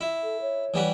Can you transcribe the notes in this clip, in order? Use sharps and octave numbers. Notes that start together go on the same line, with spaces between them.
E4
A4
C#5
E3 G3 F#4